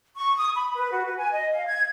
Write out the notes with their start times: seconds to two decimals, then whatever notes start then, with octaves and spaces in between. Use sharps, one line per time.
0.17 C#6
0.36 D#6
0.56 B5
0.74 B4
0.92 F#4
1.05 B4
1.17 G#5
1.31 D#5
1.52 F5
1.67 G#6